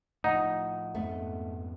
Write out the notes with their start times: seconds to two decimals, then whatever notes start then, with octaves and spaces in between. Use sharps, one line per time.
0.24 A2 F3 D#4 F#5
0.95 F2 G#2 A3 B3